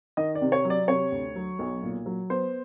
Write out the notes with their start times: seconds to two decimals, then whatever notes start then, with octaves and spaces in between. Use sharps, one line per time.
0.17 D#3 D#5
0.35 D5
0.41 C3
0.52 C#5
0.65 F#3
0.70 D5
0.88 C3 C#5
1.12 D2
1.36 F#3
1.59 B1
1.82 A#2
2.06 F#3
2.30 B3 C5